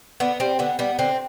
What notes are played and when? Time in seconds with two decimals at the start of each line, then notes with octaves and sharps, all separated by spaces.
0.20 D3 B3
0.40 G3 C4
0.59 D3 B3
0.79 G3 B3
0.99 D3 C4